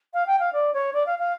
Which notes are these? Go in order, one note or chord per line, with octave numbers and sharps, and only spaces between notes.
F5
G5
F5
D5
C#5
D5
F5
F5